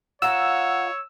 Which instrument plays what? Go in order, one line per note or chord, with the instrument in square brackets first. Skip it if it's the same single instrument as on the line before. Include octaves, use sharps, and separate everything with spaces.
[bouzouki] F4 A#4 D#5 [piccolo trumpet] C#5 [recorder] F#5 [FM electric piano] E6